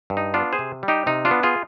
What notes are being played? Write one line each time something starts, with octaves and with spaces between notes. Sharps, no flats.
G2
D#4
B3 D4 F4
G#4 C5
C3
G3
D#4 G4
C3 D#4
D4 F4
B3
F4 G#4